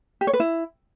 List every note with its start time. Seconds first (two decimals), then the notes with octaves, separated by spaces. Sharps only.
0.21 G4
0.27 C#5
0.34 B4
0.40 E4